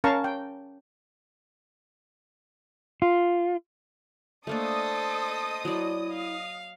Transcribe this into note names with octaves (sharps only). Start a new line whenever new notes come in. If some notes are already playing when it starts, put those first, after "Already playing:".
C#4 A#4 F5 A5 A#5 C#6
G5
F4
A3 A#3 D4 A4 C5 D#5 D#6
F#3 E4 D5
F5